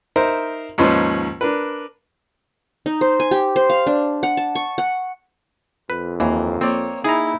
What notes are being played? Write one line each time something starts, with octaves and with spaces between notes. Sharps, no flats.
D#4 A#4 C5 E5
D#2 G#2 F3 C#4 B4 C6
D4 A#4 B4
D#4
C5
G#5
G4
C5
F5
D4
F#5
A5
C#6
F#5
F2 B4
D#2 E3 A#3
A#3 C4 C#5 D5
D#4 E4 G#4 A#5